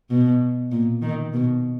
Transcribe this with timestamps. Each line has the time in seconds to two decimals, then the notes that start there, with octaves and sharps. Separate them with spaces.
0.10 B2
0.72 A#2
1.02 D#3
1.33 B2